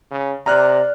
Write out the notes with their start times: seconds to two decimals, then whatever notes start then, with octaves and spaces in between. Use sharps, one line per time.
0.11 C#3
0.46 C3 D5 A#5 F6 F#6